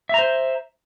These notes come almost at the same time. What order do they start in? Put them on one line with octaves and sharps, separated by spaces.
E5 A#5 C5